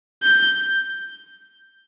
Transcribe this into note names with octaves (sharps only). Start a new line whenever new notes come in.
G6